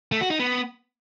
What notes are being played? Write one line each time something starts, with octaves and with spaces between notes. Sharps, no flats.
A3
F#4
D#4
B3